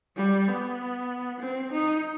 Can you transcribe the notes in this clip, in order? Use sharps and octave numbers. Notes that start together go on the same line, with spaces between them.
G3
B3
C4
D#4